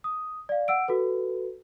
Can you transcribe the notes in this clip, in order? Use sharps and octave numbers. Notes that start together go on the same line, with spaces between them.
D#6
D5 F5
F#5 E6 D7
F#4 A4 B4